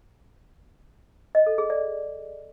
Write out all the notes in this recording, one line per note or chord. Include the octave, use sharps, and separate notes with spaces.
D#5
A4
G#4
D5